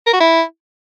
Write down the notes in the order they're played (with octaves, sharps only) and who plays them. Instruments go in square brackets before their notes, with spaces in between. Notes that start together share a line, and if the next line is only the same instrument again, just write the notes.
[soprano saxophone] A#4
F#4
E4